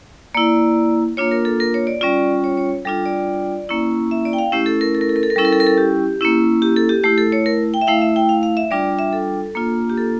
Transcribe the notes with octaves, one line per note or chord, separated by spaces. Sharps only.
A#3 E4 D5
A#3 D4 F4 C#5
A#4
A4
A#4
C#5
D5
G3 C#4 F4 D5
C#5
C#5
G3 D4 F4 A4
D5
A#3 C#4 E4
E5
D5
G5
F5
A3 C#4 E4 G4
A4
A#4
A4
A#4
A4
A#4
A4
A#4
G3 C#4 E4 A4
A#4
A4
A#4
A4
G4
A#3 C#4 E4
G4
A4
G4
A3 E4 G4
A4
C#5
A#4
G5
E5
A3 E4 F5
E5
G5
F5
F5
E5
G3 D4 F4 D5
E5
A4
A#3 D4 F4
G4
A4